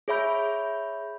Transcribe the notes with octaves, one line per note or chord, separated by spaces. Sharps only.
G#4 C#5 E5 B5 G6